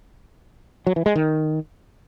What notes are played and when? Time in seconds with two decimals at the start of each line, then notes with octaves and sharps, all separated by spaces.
0.87 F#3
0.96 E3
1.06 G#3
1.15 D#3